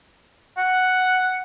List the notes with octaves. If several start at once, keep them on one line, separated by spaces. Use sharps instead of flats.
F#5